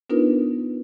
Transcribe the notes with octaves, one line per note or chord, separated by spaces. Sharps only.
B3 D4 D#4 F4 A#4 B4